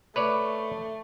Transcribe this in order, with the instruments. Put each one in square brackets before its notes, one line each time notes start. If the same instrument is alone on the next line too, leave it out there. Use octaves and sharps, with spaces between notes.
[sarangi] A3 [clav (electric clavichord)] B4 C#5 D5